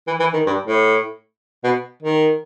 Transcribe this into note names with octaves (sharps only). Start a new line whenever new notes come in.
E3
E3
D#3
G2
A2
B2
D#3